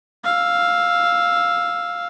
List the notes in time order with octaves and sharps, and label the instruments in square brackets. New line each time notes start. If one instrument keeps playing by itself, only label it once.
[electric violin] F5 E6